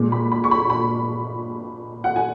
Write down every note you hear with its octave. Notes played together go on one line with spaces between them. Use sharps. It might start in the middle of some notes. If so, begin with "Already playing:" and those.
Already playing: A#2 G#3
B5
B5
C#6
B5
B5
F#5
G#5